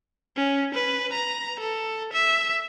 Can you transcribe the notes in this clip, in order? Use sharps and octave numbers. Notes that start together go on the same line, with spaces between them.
C#4
B4
A#5
A4
E5